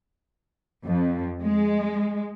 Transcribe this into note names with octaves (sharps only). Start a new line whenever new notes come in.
F2
G#3